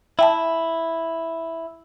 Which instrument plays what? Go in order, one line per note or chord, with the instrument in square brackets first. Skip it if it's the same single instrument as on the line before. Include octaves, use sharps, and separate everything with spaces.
[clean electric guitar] E4 [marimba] E5 G5 A5